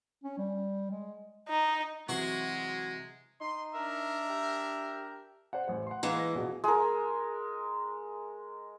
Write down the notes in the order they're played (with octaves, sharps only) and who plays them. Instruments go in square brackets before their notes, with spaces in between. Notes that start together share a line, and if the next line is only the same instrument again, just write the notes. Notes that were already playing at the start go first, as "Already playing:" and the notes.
[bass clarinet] C#4
G3
G#3
[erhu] D#4
[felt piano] C3 E3 F#3 [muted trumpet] G#3 [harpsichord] F#4 C6 C#6
[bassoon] D#4 [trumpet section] C6
[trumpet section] D4 A#4 E5
[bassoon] G4
[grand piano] C5 D5 F#5
A1 C5
F#5 C6
[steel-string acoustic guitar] E3 G#3 A#3
[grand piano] A#6
A#1 B2 G#4
[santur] G#3 A#4